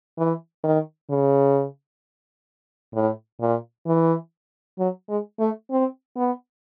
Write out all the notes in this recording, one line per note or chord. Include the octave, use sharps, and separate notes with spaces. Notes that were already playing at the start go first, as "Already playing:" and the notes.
E3
D#3
C#3
A2
A#2
E3
F#3
G#3
A3
C4
B3